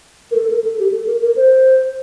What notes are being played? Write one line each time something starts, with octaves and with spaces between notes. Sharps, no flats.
A#4
A4
A#4
A4
G4
A4
A#4
A#4
C5